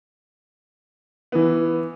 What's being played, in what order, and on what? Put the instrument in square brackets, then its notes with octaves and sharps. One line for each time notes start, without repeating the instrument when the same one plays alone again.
[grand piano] E3 B3